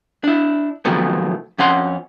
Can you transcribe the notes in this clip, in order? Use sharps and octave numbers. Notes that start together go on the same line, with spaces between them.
D4 E4
C3 D#3 F3 F#3 A3 B3
F2 C#4 F#5 C6